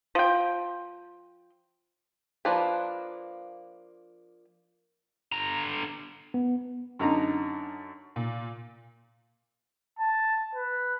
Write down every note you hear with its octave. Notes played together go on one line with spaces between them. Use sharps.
F3 G5
F3 A#3 D4 B4 B5
D3 A#5
B3
F#2 D3 D#4 A#5
A#2
A5
B4